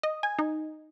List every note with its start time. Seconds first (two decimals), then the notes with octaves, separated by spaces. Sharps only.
0.03 D#5
0.23 G#5
0.39 D#4